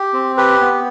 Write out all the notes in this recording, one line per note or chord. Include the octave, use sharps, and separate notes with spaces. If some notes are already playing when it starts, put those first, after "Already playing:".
Already playing: G4
C4
G4 B4
B3